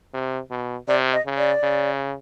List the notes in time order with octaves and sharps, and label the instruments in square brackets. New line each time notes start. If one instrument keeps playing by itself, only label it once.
[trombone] C3
B2
[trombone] C3 [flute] D5
[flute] D#5
[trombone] C#3
[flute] D5
[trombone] C#3